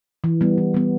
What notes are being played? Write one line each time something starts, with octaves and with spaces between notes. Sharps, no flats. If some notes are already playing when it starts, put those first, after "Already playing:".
E3
G3 B3
E3
G3 B3